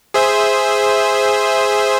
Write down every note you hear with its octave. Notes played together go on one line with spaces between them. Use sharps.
G#4 C5 E5